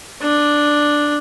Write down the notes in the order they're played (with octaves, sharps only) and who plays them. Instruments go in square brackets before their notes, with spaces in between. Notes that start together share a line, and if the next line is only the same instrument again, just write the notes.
[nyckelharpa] D4